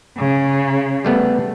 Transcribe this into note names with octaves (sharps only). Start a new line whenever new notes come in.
C#3
G3 A3 B3